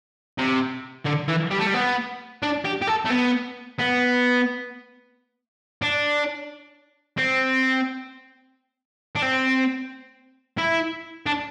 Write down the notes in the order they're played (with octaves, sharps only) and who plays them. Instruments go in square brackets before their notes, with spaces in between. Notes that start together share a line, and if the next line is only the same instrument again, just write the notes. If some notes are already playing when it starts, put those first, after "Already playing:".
[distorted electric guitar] C3
D3
E3
G3
A3
G3
B3
D4
G4
G4
A4
A3
B3
B3
D4
C4
D4
C4
E4
D4